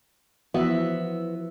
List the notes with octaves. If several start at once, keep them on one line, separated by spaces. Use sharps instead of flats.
E3 F3 B3 F#4 E5